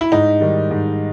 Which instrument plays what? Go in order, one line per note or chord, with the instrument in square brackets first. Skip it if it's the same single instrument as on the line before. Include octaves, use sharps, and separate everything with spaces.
[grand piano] E4
G#2 D#4
D#3 G3
G#2